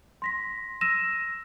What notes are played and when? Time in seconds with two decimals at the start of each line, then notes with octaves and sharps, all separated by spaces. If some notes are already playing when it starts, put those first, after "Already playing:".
0.22 C6 A#6 B6
0.81 E6 A#6 D#7 E7